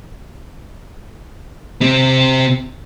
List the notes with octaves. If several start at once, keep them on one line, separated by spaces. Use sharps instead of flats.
C3 C4